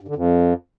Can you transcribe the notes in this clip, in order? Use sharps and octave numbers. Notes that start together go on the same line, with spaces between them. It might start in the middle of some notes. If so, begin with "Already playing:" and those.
G2
D3
F2